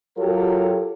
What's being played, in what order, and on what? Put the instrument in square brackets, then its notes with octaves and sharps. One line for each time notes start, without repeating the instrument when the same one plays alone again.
[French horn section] F#3 F4 G4 A4 A#4 C#5